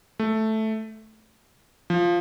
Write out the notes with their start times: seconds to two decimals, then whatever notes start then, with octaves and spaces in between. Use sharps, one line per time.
0.19 A3
1.90 F3